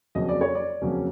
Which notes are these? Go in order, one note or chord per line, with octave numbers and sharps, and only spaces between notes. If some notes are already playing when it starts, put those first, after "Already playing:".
F2 C#3 F#3 A#3 C#4 D#5
D5
C#5
D5
F2 C#3 F#3 A#3 C#4